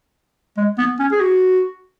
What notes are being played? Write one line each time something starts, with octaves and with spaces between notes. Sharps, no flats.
G#3
B3
C#4
G#4
F#4